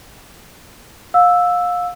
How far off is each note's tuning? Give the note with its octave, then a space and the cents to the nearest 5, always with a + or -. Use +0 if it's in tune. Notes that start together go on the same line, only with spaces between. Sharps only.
F5 +30 E6 +0